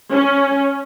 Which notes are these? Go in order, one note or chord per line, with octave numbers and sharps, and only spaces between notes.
C#4